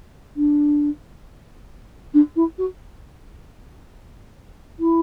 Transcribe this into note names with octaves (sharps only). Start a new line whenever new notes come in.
D4
D4
E4
F#4
E4